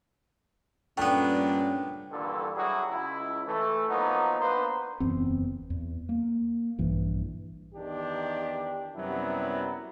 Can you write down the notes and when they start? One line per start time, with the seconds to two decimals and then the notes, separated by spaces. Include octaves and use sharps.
0.97 G2 A#2 A3 B3 C#4 D4 G5
2.12 G2 A#2 D3 E3 A4
2.56 F#3 G3 E4 F#4 G#4
2.90 C#2 E4
3.47 E3 A3
3.90 F3 F#3 A#3 B3 D#4
4.40 A#3 B3 D4 B4 C5
5.00 F#1 E2 B3 C4
5.70 E2
6.09 A#3
6.79 A#1 G2 E3
7.75 E2 D#3 D4 G4
8.96 F#2 C3 F#3 G3 B3 E4